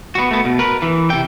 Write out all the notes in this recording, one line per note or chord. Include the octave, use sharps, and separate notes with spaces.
B3 F#4
A3 B3
B2
A#4 B4
E3
C3 G5